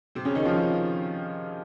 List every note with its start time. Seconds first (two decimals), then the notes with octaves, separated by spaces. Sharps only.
0.15 C3 C4
0.25 C#3 C#4
0.35 D#3 D#4
0.45 F3 F4